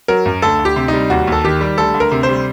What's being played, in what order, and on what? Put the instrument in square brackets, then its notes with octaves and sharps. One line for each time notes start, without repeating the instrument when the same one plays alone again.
[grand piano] F#3 A#4
F#2
D2 A4
D2
G4
C3
D#4
G3
D#2 F#4
D#2 A4
D#3 G4
G3
D2 A4
D2
A#4
C3
C5
G3